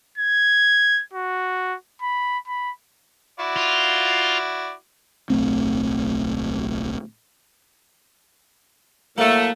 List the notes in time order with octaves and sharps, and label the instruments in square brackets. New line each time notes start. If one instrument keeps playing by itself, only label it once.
[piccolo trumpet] G#6
F#4
B5
B5
[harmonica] E4 F#4 D5
[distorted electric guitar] F4
[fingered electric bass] D1 B1 A3 C4
[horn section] A2 F#3 A3 [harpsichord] A#3